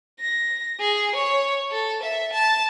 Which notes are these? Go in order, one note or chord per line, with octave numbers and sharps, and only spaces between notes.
A#6
G#4
C#5
A4
E5
A5